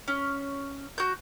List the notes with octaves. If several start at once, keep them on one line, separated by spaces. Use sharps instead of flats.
C#4
F#4 G6